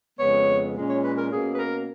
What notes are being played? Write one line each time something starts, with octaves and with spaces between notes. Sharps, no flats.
F2 C#3 G#3 B3 C#5
A#2 G#3 C#4
C#5
B4
A#4
B2 A#3 C#4 G#4
B4
A#4